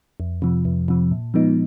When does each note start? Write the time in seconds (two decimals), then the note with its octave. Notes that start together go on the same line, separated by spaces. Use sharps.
0.20 F2
0.42 C3 F3
0.65 F2
0.88 C3 F3
1.11 A#2
1.34 F3 G#3 B3 D#4